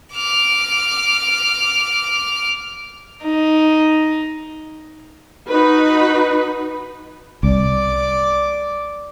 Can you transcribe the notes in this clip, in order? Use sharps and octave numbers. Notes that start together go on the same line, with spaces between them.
D6 F6
D#4
D#4 F#4 B4
C2 D5 D6